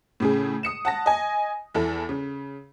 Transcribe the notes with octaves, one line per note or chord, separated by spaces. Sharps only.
A2 C#3 G#4
D#6 C#7 E7
F#5 A5 A#6
D#5 G#5
E2 E4 A4
C#3